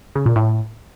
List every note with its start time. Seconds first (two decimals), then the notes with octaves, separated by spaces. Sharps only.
0.15 C#3
0.26 A#2
0.36 A2